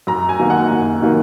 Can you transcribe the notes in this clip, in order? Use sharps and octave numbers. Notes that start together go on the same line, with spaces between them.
F#2 A#5
G#5
D#3 F#3 A#3
F#5
F#2
D#3 F#3 A#3